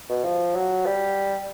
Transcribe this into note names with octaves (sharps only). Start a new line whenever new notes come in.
B2
F3
F#3
G3